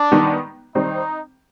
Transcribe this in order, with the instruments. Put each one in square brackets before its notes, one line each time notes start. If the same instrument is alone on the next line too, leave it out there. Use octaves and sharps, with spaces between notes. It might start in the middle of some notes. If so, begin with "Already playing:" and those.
Already playing: [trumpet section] D4
[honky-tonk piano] D#3 G3 B3 D#4
[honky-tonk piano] D#3 G3 C4 [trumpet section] D#4